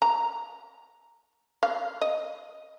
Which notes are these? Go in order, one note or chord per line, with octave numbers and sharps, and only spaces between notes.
A#5
F5
D#5